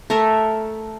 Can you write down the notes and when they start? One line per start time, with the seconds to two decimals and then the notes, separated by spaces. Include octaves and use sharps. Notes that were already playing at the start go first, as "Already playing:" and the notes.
0.10 A3 A4 A#4 E5